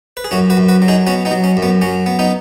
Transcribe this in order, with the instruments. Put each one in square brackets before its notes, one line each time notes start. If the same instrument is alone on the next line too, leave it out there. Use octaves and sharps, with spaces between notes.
[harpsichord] B4
G#4
F#2 C#4 F#4
F#4 B4
F#2
F#4 B4
F#3
D#4 G#4
B3 C#4 F#4
B3 D#4
F#3
C#4
F#2
B3
F#3 C#4
B3
B3 D#4